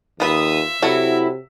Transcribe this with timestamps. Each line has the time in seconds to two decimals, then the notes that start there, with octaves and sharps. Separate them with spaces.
0.20 D#2 F4 B4 E5 D#6
0.82 C3 F#3 E4 F#4 A4